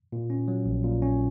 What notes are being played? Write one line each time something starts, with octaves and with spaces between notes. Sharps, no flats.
A#2
C#4
F#3
A#1
A#2
C#4